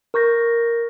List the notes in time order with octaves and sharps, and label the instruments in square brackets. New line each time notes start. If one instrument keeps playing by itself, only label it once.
[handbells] A#4 C#6 G6 A#6